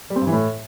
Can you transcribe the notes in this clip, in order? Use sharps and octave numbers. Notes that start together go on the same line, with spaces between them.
G3
C4
G2
E3
A2